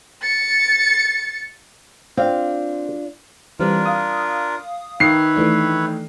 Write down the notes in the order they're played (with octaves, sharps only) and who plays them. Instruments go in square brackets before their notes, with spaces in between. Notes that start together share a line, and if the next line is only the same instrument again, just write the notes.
[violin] A6 C#7
[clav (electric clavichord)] C4 [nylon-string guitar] D4 F4 F5
[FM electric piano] E3 G3 C4 [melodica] D4 F4 A#4
[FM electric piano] F5 D#6
[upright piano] D#3 C7 [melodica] B4 C#5 E5
[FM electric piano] E3 A3 D4